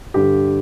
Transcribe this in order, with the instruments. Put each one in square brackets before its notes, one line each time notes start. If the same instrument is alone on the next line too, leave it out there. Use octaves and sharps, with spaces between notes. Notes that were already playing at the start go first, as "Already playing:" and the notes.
[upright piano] G2 D3 G4